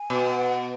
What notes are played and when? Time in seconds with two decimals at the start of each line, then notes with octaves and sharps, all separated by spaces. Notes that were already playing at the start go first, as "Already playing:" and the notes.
Already playing: G#5
0.10 B2
0.30 F#5